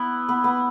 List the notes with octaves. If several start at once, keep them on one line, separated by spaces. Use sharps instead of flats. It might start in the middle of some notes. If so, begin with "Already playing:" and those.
Already playing: B3 E4
B3
B3